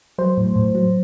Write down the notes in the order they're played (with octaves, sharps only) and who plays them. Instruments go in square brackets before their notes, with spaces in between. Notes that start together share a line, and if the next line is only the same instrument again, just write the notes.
[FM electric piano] F#3 C5
A2
A2
F#3